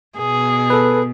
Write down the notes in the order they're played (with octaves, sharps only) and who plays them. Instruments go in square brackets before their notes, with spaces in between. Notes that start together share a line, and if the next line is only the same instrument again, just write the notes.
[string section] B2 [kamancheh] G#4
[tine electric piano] A4 B4